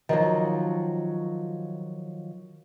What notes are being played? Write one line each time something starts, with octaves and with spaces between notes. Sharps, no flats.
D#3 F3 F#3